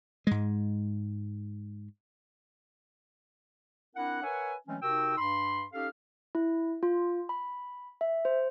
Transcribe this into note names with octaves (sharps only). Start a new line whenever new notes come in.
G#2 G#3
C4 D4 E4 A#4 F#5
A#4 B4 C#5 E5 F#5 G#5
E3 F#3 G#3 A3 C4 C#4
C3 D#4 F#4 A#4 G5 E6
G2 B5 C6
C#4 D#4 G4 A4 F5
E4
F4
B5
E5
C5